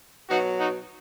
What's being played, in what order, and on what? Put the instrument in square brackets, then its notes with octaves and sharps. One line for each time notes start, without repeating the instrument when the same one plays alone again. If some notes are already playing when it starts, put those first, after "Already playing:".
[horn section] B2 F#3 D#4 F#4
D#4 F#4